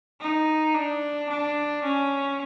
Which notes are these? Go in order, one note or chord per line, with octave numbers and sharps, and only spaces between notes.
D#4
D4
D4
C#4